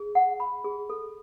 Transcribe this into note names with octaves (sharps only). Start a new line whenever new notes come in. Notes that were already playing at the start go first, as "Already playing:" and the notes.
Already playing: G#4
F#5
B5
G#4
A4